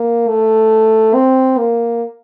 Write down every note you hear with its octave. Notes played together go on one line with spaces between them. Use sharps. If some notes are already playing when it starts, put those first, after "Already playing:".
Already playing: A#3
A3
C4
A#3